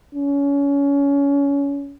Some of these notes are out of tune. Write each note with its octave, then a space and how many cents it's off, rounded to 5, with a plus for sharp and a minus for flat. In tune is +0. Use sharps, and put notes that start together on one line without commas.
C#4 +25